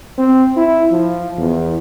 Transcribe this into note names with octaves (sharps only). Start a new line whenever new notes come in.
C4
E4
F3
E2